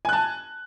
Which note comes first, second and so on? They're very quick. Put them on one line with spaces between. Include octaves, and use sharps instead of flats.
G#5 F#6 A5